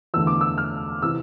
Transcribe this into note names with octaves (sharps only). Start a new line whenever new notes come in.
E2 D3 A3 E4 E6
D6
E6
F6
C3 E3 E6